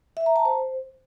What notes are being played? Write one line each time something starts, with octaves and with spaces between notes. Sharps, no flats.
E5
A#5
A5
C5